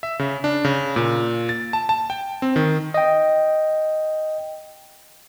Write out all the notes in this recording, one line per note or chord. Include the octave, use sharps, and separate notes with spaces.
E5
C#3
D4
C#3
A#2
A6
A5
A5
G5
C4
D#3
D#5 G5